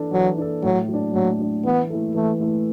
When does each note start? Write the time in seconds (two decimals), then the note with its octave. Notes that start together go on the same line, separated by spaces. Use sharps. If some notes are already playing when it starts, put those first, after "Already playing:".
Already playing: E3 D4 A4
0.12 E3 F#3
0.38 D4 A4
0.63 A2 F#3
0.88 F#3
0.94 D4
1.14 A2 F#3
1.40 F#3 D4
1.65 E3 B3
1.90 A3 E4 A4
2.15 E3 A3
2.40 A3 E4 A4